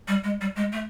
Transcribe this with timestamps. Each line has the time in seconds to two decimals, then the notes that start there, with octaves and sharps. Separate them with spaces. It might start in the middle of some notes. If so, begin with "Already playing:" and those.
0.08 G3
0.24 G#3
0.41 G3
0.56 G#3
0.72 A3